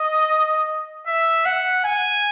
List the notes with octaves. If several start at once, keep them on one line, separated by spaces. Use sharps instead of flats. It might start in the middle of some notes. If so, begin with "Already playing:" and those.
Already playing: D#5
E5
F#5
G#5